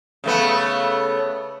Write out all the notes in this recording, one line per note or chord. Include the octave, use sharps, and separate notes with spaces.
C#3 A3 B3